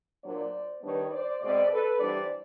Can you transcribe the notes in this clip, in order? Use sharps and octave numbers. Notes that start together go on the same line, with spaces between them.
A#2 F#3 A#3 D4 C5 D5
D#3 G3 B3 D4 B4 C#5
C5 D5
B2 G#3 C4 C5 D5
A4 B4
E3 G3 B3 D4 C5 D5